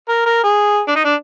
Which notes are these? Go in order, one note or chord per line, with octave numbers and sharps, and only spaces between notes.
A#4
A#4
G#4
D4
D#4
D4